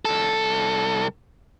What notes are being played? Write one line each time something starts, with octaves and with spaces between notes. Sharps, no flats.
C2 A4